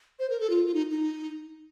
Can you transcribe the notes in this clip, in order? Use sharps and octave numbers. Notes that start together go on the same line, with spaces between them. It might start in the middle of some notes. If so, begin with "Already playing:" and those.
C5
A#4
A4
F4
F4
D#4
D#4